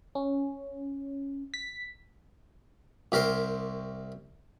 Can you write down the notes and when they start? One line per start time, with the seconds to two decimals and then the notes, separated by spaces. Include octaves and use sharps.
0.15 C#4
1.54 B6
3.12 C2 G4 A#4 C5 C6